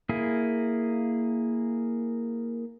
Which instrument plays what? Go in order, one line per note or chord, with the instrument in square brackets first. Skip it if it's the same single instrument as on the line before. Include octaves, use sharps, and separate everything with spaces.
[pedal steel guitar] A#3 E4 G#4